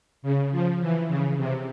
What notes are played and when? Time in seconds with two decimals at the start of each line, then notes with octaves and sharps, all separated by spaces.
0.22 C#3
0.51 F3
0.80 E3
1.08 C#3
1.37 C3